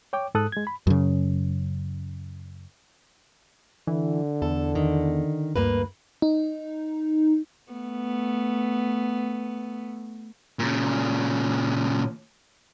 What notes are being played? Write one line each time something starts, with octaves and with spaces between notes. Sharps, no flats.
C#5 G5 D6
G#2 A4 D#6 F#6
G#3 G#6
B5
F#2 C#3
D3 E3
E2 A4
D#3
D2 G2 A#3 B4
D#4
A3 B3
A#2 C#3